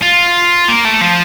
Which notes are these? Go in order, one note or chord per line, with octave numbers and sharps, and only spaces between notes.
F4
A#3
A3
F3